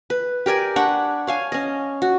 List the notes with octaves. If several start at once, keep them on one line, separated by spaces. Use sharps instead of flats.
B4
G4 A#4 D5 G#5
D4 F#5 B5 C#6
C#5 F5 G#5
C#4 D#5
F#4